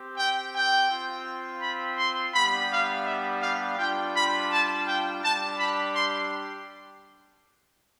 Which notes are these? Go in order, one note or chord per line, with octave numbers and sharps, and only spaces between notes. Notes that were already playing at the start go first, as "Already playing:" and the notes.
Already playing: C4 G4
G5
G5
C4 F4
B5
C6
G3 B3 D4 G4 B5
F5
E5
F5
G3 D4 F4 G5
B5
A5
G5
G3 D4 G4 A5
B5
C6